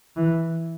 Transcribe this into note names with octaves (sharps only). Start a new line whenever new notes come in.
E3